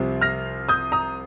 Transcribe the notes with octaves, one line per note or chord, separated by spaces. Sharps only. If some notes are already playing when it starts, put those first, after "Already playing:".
Already playing: C2 C3 F3
F6 A#6
D#6 G6
A#5 D#6